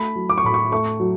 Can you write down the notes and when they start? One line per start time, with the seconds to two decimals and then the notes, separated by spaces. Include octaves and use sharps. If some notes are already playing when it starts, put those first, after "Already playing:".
Already playing: A3 B5
0.16 F#3
0.29 D6
0.38 C#6
0.44 A2 B5
0.54 C#6
0.72 A3 C#6
1.00 F#3